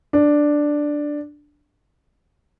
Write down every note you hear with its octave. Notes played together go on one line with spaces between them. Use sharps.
D4